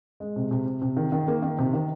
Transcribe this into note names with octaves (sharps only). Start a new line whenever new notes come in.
G#3
C3
C3
C3
C3
D#3
D#3
A#3
D#3
C3
D#3